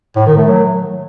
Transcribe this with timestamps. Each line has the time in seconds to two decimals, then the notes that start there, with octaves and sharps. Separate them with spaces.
0.16 A2
0.26 D#3
0.37 A3
0.48 F#3